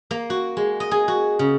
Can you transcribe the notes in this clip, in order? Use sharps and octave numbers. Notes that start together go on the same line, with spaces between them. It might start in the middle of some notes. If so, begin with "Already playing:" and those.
A#3
F#4
G#3
D#5
G#4
F#4
C#3